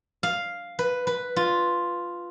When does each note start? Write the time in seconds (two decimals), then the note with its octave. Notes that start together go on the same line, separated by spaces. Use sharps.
0.23 F5
0.79 B4
1.07 B4
1.36 F4